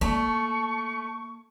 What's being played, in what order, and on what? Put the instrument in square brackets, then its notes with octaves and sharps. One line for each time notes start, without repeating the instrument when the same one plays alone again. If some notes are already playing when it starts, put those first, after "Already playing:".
[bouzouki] A3 [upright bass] A#3 [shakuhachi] A5 [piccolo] C#6